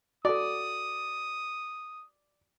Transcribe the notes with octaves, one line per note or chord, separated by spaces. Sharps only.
F#4 A4 D5 D#6